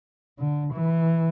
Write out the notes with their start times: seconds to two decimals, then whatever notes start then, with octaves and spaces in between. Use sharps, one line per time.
0.39 D3
0.73 E3